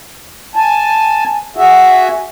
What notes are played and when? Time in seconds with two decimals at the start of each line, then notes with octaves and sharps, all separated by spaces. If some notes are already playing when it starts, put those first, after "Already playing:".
0.56 G#5 A5
1.57 F#4 G#4 E5